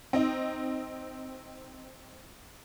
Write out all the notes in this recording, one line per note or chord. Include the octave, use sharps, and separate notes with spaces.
C4 D#4